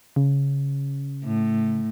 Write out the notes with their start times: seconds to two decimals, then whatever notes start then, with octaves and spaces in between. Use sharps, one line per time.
0.16 C#3
1.24 A2